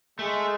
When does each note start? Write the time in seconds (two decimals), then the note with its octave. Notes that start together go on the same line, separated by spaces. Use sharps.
0.19 G#3 A3